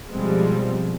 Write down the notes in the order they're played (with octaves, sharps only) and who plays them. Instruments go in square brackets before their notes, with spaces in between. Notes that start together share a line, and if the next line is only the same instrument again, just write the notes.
[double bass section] B2 F3 C4 [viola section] G3 G#3